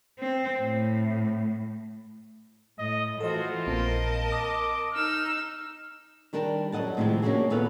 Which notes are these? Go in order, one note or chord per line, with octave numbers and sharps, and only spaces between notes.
C4
A2
A2 D#5
E3 F4 F#4 A4 C5 D#5
A#1 A#2 C4 A#4 D#5 A5
D6 D#6 A#6
D#4 E6 F6
D#3 G3 D4 A#4 A5
F#2 A#4 D#5 F#5 A5
A2 C3 D#3 F3 G#3
A#3 C#4 D4 F#4 G#4
D#2 A#2 B3 A4 B4 F5